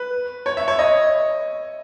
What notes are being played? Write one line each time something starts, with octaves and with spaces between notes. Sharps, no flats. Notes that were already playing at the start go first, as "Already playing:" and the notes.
Already playing: B4
C#5
E5
C#5
D#5